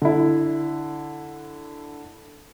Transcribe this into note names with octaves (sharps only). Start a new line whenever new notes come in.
D3 E4